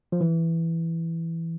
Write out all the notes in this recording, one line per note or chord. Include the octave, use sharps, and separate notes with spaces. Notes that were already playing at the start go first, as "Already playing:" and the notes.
F3
E3